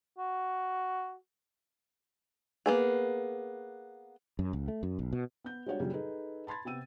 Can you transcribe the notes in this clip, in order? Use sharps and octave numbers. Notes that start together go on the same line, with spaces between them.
F#4
A#3 B3 G#4
F#2
C#2
A3
F#2
B1
B2
B3 G6
G3 G#3 D4 F#4 C#5 F#5
F#2 A#2 C#3 F#3 G3
D#4 G#4 A4 B4
A5 B5 C6 G#6 A6
C3 B3 G5 E6 D#7